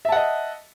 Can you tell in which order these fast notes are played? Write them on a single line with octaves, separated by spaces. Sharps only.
E5 A5 F#5 D#5